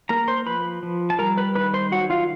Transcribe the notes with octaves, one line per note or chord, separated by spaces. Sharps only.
A#3 A#4 A#5
C5 C6
F3 B4 B5
F3
A5
G3 A#4 A#5
B4 B5
D#3 B4 B5
C5 C6
F#3 F#4 F#5
F4 F5